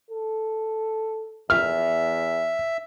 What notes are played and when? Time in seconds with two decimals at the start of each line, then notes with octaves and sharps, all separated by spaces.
0.11 A4
1.50 E2 E5 F6